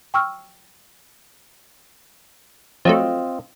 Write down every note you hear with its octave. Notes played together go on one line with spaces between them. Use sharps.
G5 C#6 E6 F6
F3 F#3 A3 C4 F4 D#5